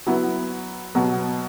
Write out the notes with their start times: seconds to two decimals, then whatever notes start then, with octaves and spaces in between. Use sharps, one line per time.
0.07 F#3 B3 E4
0.95 B2 F#3 B3